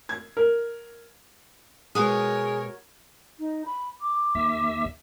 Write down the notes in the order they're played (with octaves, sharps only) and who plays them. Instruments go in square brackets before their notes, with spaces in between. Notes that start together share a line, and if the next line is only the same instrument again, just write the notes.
[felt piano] G#6
A#4
[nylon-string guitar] B2 G#3 [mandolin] F#4 D#6 [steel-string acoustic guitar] G#4 [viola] A#4 C#5
[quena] D#4
B5
D6
[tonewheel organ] D#2 E5